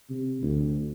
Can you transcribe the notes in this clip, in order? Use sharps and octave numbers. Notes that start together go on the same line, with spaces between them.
C3
D2